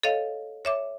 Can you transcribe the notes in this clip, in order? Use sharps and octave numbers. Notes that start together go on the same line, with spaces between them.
A4 C#5 D#5 F5
C#5 E5 D6